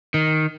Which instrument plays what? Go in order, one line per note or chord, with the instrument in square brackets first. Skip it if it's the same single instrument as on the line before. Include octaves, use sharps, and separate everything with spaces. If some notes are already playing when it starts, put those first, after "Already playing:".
[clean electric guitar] D#3